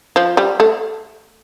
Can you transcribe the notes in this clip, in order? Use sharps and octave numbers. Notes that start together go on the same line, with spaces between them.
F3
G3
A3